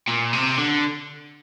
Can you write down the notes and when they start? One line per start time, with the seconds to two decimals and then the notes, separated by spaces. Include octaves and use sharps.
0.08 A#2
0.33 C3
0.58 D3